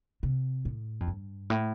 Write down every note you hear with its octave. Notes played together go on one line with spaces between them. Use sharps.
C3
A2
F2
G2
A2